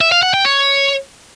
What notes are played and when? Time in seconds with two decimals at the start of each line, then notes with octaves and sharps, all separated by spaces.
0.01 E5
0.12 F5
0.23 F#5
0.34 G5
0.45 C#5